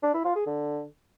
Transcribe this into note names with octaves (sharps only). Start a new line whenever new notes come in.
D4
E4
F4
G#4
D3